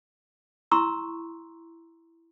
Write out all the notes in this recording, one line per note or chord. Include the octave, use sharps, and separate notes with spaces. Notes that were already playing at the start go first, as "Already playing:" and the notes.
E4 A#5 C6 C#6 E6